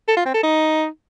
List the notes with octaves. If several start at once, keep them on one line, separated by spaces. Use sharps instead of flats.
A4
F4
C4
A4
D#4